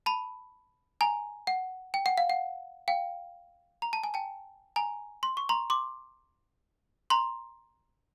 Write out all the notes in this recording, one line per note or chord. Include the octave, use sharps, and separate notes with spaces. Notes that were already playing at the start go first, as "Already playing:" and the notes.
A5 B5
G#5 A#5
F#5
G5
F#5
F5
F#5
F5 G5
A#5
A5
G#5
G5 A5
G#5 A#5
C6
C#6
A#5 C6
C6 D6
A#5 C6